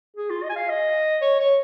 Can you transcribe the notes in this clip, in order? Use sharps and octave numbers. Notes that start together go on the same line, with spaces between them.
G#4
F4
D#5
G#5
F5
D#5
C#5
C#5